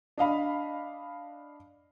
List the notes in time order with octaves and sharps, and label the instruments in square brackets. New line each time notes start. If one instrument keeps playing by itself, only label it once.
[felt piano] D4 D#5 F5 B5